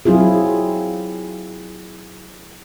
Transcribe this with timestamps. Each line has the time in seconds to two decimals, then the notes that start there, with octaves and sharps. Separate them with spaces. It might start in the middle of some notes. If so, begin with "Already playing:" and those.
0.05 F#3 C4 E4 F4 G#4